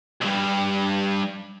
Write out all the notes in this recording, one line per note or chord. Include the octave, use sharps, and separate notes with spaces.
B1 G2